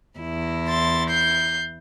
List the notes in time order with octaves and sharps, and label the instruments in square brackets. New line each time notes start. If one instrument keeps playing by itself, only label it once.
[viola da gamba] E2 E4
[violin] C6 A6
G6 C7